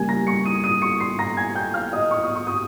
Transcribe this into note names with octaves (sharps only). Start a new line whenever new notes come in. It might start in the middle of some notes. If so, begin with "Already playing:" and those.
Already playing: C#3 G3 A#3 G#5 G#6
A#5 A#6
C#6 C#7
D#6 D#7
D#6 D#7
C#6 C#7
C6 C7
A#5 A#6
G#5 G#6
G5 G6
F5 F6
D#5 D#6
C#6
D#6
C#6
D#6